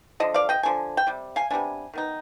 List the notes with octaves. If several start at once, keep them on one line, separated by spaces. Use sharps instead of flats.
D3 F3 D#5
D5 F5
D#5 G5
D3 F3 G#5
G5
C3 G3
F5 G#5
C3 G3 B3 D4 G#5
D#3 B3 D#4